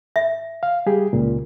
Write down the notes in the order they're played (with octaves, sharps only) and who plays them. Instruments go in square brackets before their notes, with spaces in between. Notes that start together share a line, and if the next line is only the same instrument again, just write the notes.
[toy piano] E5
[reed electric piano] F5
G3 G4 G#4
C#2 A#2